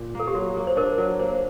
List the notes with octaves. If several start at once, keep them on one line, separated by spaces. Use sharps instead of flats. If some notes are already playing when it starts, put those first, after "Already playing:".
Already playing: A#2
A#3 A4
G4
F#3 F#4
A#3
C5
D4 A#4
F#3
A#3 C5